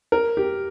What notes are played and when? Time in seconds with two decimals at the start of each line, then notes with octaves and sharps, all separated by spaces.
0.12 A#4
0.37 G4